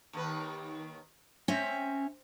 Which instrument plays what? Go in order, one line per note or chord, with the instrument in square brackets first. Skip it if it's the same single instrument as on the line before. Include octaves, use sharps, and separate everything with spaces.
[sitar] D#2 D#3 B4
[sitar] C4 [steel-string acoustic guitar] C#4 E5